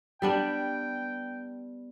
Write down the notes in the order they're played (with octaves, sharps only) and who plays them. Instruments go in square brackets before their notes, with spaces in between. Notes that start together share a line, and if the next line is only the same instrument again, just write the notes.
[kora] G3 B3 D4 [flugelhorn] G5